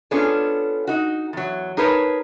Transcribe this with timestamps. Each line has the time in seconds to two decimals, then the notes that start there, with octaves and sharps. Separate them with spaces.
0.11 B3 C#4 D4 F4 G#4 A4
0.87 D#4 F#4
1.33 E2 F#3
1.77 D#4 G#4 A#4 B4 C#5 A5